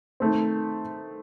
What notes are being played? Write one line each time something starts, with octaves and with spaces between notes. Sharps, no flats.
D#3 A3 C4